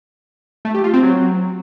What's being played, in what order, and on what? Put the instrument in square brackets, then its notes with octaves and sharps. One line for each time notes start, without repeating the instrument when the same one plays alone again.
[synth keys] A3
G4
F4
C4
F#3